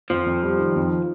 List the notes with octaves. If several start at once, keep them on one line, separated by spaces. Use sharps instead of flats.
F2 F3
F2
G3
D#3
F2